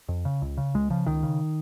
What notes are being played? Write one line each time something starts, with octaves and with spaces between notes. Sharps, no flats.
F2
C#3
C#2
C#3
C#2 G#3
C#3 F3
C#2 D#3
C#3